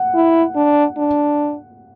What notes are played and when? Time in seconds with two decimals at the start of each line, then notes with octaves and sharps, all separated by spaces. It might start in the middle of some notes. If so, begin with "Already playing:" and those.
Already playing: F#5
0.15 E4
0.56 D4
0.98 D4